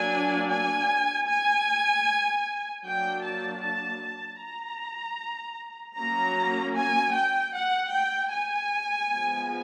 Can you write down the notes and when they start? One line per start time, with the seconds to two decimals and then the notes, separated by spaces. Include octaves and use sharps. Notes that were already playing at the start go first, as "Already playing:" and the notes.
Already playing: F#3 A#3 D4 G#5
0.50 G#5
1.29 G#5
2.85 F#3 A#3 D4 G5
3.24 A5
3.63 A5
4.03 A5
4.41 A#5
5.98 F#3 A#3 C#4 A#5
6.76 G#5
7.15 G5
7.55 F#5
7.94 G5
8.33 G#5
9.11 F3 G#3 B3